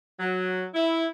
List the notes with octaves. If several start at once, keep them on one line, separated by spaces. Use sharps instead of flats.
F#3
E4